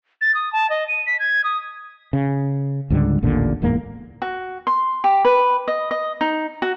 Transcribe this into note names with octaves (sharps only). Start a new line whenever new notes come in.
A6
D#6
A5
D#5
D#7
B6
G#6
D#6
C#3
C#2 G#2 D3 G3
A1 D#2 A#2 D3
D1 E2 G#2 A#3
F#4
C6
G4
B4
D#5
D#5
D#4
F#4